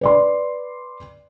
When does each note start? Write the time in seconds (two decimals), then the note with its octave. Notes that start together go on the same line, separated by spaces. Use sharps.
0.01 B4 D5 C6